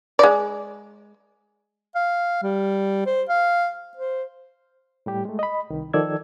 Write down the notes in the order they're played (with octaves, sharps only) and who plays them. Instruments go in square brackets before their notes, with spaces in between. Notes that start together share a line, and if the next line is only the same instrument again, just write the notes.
[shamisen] G#3 D5
[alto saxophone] F5
G3
C5
F5
C5
[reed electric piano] A2 G3 G4
G#3 A3
D#5 B5
C2 D#3
D#3 F3 A4 D5 E6 G#6